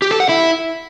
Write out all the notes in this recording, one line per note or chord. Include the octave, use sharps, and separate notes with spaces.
G4
A4
F#5
E4